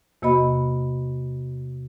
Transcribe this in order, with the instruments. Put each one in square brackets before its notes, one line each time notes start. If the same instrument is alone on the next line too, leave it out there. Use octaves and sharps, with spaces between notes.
[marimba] E2 C3 A#3 F#4 D#5 B5